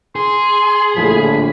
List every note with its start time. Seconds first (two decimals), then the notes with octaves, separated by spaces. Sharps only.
0.16 G#4 C6
0.96 A#1 A2 D3 F3 B5